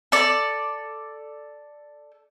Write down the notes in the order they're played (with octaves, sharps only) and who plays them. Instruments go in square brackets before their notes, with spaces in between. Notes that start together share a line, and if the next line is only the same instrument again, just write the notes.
[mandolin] A4 D5